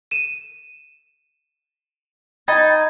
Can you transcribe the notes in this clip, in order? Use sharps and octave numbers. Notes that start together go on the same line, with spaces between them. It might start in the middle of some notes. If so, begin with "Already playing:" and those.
D#7 E7
D#4 G5 B5 G#6 A6